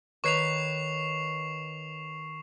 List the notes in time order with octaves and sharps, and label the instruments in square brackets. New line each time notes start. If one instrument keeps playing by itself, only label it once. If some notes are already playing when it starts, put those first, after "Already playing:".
[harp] D#3 B4 C#5 [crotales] C#6 C7 F7